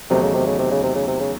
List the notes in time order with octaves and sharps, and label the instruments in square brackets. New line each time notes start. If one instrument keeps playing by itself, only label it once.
[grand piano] E2 D#3 F#3 A3 D#4 [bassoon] C3
[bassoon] C#3
C3
C#3
C3
C#3
C3
C#3
C3
C#3